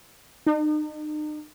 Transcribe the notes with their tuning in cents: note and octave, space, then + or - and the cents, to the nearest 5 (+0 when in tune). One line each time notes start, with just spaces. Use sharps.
D#4 -40